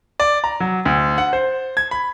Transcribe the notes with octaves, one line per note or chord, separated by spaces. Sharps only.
D5
A#5
F#3
D2
F#5
C5
G#6
B5